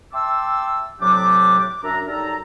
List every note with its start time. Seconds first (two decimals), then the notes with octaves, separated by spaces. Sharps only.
0.13 E5 G5 A5 C6 D6 E6
1.00 A2 C3 F#3 D4 G4 D6
1.60 D6
1.83 F#2 D4 E5 A#5
2.07 F#2 G3 D#4 A4 A#5